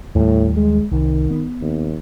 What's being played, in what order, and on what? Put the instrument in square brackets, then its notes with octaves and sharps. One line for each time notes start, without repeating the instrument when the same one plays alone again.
[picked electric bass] D#2 G3 [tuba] A2
[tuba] G#3
[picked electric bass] C2 [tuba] D#3
[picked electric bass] B3
[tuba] D#2